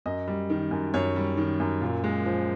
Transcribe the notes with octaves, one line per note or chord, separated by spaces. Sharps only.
F#2 D#5
G3
D#3
F#2
F#2 C#5
G3
D#3
F#2
A#2
G#3
F3